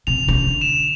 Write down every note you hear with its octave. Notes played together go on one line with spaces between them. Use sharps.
C3 F7
C#3
D3
E7